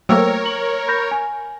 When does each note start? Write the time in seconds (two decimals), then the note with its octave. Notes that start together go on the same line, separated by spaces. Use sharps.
0.09 F#3 A3 A#3 A#4 C5 C#5 G5 E6
0.46 F#7
0.88 B5 G6 A#6
1.11 G#5